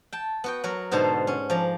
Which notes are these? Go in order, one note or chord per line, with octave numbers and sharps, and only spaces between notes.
G5 A5
B3 F#4 G5
F#3 F#4 A#4
G#2 B2 D3 C5 A5 A#5
C#4
F3 D5 A#5